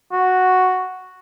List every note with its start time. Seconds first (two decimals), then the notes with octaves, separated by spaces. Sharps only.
0.12 F#4